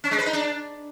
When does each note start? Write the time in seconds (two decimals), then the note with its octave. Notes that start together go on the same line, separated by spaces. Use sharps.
0.04 C#4
0.11 G#3
0.18 B4
0.26 D#4
0.33 D4